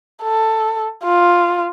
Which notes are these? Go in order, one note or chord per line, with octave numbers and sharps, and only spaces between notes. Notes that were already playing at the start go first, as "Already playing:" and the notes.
A4
F4